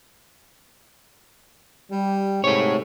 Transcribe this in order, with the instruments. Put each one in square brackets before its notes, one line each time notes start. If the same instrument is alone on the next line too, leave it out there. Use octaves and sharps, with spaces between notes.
[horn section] G3
[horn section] G#2 C3 [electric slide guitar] A3 C#5